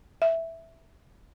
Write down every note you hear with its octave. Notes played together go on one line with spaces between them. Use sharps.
E5